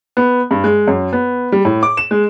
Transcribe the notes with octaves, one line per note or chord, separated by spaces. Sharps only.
B3
G2
G#3
F#2
B3
G3
A2
D6
E7
G#3